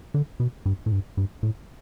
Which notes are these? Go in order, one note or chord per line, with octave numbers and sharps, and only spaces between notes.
D3
B2
G2
A2
G2
G2
A2